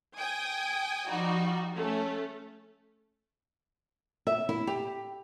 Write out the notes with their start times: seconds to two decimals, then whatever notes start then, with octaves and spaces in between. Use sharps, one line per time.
0.18 G5 G#5 D#6
1.07 F3 G3 D#4 F#4
1.75 A3 C#4
4.27 E5
4.49 E4
4.67 G4